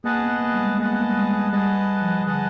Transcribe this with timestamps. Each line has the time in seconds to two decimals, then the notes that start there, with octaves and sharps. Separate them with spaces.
0.04 A#3 G#4 B4 D#5 F#5 A5
0.18 C4
0.23 B3
0.41 A#3
0.54 G3
0.60 G#3
0.79 A#3 G#4 B4 D#5 F#5 A5
0.89 B3
1.01 A#3
1.11 G3
1.15 G#3
1.52 G3 G#4 B4 D#5 F#5 A5
2.02 F3
2.26 D3 G#4 B4 D#5 F#5 A5